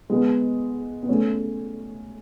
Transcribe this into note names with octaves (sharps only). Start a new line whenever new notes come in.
G#3 B3
B3
A3 C#4